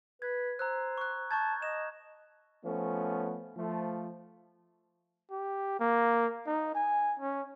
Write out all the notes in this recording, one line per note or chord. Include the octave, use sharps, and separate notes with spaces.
B4 G#6
C5 A#5 E6 F#6
C#6 F#6
A5 C#6 G6 G#6
D#5 E7
F3 A3 B3 C#4
F3 A3
G4
A#3
D#4
G#5
C#4